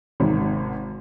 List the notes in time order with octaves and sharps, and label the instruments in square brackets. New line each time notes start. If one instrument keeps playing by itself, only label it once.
[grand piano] G#1 G#2 C3